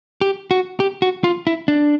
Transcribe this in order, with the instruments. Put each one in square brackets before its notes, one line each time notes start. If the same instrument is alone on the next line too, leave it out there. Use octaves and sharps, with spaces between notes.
[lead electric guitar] G4
F#4
G4
F#4
F4
E4
D4